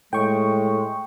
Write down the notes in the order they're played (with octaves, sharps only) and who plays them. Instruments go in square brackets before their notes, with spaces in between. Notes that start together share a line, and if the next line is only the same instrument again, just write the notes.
[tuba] A2 [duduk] G#3 [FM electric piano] G5 C#6